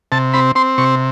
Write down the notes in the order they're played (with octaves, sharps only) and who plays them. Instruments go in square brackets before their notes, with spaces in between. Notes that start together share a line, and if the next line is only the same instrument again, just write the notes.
[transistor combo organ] C3 A5
C4 B5
C4 C6
C3 C#6